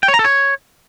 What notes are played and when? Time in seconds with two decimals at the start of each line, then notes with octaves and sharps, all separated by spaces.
0.03 G5
0.08 C#5
0.14 A#5
0.19 A4
0.25 C#5